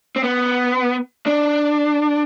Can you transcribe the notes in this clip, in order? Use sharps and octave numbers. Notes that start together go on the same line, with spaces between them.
C4
B3
D4